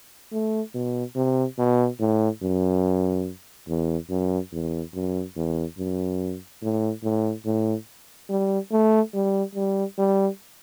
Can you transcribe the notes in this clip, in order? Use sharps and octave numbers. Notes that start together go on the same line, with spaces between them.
A3
B2
C3
B2
A2
F#2
E2
F#2
E2
F#2
E2
F#2
A2
A2
A2
G3
A3
G3
G3
G3